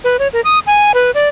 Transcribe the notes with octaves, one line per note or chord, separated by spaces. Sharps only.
B4
C#5
A#4
D#6
G#5
B4
D5